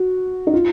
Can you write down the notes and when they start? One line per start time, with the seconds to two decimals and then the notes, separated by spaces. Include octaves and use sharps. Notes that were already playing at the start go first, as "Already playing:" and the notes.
Already playing: F#4
0.47 D#4
0.54 F4